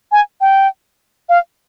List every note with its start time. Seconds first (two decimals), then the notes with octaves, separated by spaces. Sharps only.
0.12 G#5
0.41 G5
1.29 F5